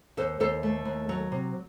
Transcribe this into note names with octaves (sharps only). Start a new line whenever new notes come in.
D#2 A4 C5
D#2 A4 C5
A3
D#2
F#3
C3